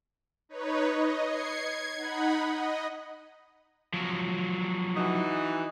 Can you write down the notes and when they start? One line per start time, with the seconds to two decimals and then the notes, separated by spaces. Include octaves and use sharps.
0.49 D#4 B4 C#5
0.86 D#5
1.24 G#6 C7 C#7
1.59 G#6
1.96 D#4 F#5 B5
2.47 D#5
3.94 F3 F#3
4.97 E3 D#4 F#4